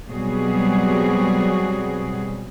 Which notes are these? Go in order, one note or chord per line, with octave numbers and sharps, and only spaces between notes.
B2 F#3 G3 C4 F#4 G#4